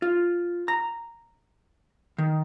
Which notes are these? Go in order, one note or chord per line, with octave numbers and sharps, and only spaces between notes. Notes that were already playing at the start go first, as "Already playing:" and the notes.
F4
A#5
D#3